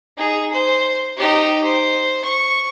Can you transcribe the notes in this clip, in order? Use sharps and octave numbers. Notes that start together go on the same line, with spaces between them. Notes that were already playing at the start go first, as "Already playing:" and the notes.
D#4 G#4
C5
D#4 G4
C5
C#6